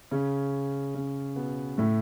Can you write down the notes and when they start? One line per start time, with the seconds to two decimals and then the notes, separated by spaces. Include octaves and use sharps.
0.11 C#3 C#4
0.94 C#3 C#4
1.36 B2 B3
1.77 A2 A3